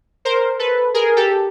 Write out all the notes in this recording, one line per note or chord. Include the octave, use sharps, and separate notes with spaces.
A#4 C5
A4 B4
G#4 A#4
G4 A4